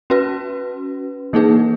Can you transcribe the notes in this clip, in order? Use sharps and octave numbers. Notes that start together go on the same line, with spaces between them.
C#4 F#4 B4
E3 A#3 D#4 G#4 B4